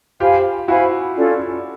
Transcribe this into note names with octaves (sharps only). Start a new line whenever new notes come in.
F4 G4 C5 F5 G#5 B5
E4 F#4 C5 F5 G#5 B5
C#4 F4 A4 D5